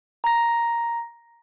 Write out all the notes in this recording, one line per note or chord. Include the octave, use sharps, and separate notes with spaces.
A#5 A#6